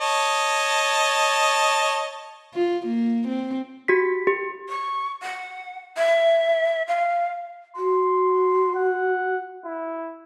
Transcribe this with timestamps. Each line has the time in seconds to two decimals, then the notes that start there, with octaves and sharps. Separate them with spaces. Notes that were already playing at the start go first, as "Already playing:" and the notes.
0.01 C#5 D#5 A5
2.54 F4
2.87 A#3
3.28 C4
3.88 F#4 G4 B6
4.27 G4
4.68 C#6
5.22 F#5
5.97 E5
6.87 F5
7.76 F#4 C6
8.75 F#5
9.65 E4